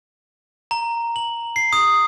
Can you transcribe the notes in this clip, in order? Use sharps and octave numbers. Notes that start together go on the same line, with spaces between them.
A#5
F#7
C7
D#6